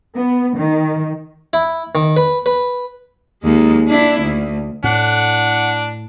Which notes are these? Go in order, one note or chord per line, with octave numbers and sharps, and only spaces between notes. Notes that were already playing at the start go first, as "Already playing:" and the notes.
B3
D#3
E4
D#3
B4
B4
D#2 G#3
D4 E4
D2
A2 D4 F#5